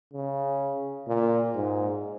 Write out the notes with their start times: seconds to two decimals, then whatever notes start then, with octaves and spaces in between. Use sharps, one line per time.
0.13 C#3
1.07 A#2
1.54 G#2